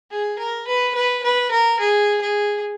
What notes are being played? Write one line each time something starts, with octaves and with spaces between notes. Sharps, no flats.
G#4
A#4
B4
B4
B4
A#4
G#4
G#4